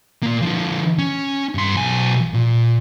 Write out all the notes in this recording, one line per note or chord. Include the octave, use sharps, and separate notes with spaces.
A#2 A#3
D3 F3
C#4
G2 C6
B1 G#5
A#2